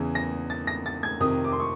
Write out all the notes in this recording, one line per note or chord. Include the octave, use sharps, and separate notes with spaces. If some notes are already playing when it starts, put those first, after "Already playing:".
Already playing: E2 C#3 E3
A#6
A6
A#6
A6
G#6
F2 C3 D#3 D#6
D6
C6
C#6